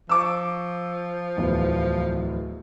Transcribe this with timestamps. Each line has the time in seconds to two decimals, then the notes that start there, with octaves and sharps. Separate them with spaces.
0.09 F3 C#6 D6 E6
1.37 D1 E2 B3